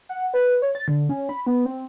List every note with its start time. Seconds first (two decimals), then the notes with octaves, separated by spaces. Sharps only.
0.09 F#5
0.34 B4
0.62 C#5
0.75 A6
0.88 D3
1.09 C#4
1.29 B5
1.47 B3
1.66 C4